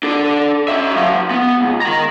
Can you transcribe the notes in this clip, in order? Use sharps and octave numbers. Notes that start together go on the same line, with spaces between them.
D4 A4
C#4 E5
F#3 F5
B3
C#2
D#3 A#5